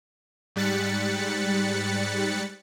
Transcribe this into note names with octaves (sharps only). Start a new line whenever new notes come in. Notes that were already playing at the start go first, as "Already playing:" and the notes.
G#2 G3 F#6 A6 B6 C#7